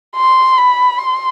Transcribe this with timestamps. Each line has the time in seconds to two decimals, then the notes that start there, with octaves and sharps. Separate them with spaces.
0.17 C6
0.58 B5
0.99 C6